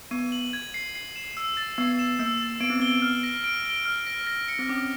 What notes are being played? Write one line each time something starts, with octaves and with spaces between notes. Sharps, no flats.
B3 D#7
F#7
G#6
C7
C7
E7
E6
A6
B3 C7
E7
A#3 E6
A6
B3 D7
C4
B3 G7
F6
A#6
D7
G7
F6
A#6
A#6
C#7
C4
C#4 D6